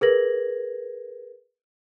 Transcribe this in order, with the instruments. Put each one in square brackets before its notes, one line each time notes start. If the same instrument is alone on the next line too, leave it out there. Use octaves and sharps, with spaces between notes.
[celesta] G#4 A#4 B4 G#6 A#6 F#7